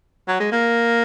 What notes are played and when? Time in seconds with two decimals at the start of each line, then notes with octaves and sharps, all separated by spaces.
0.28 F#3
0.40 G#3
0.52 A#3